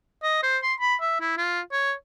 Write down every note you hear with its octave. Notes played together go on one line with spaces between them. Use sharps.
D#5
C5
C6
B5
E5
E4
F4
C#5